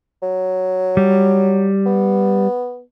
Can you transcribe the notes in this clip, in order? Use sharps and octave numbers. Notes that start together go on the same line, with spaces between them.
F#3
G3
B3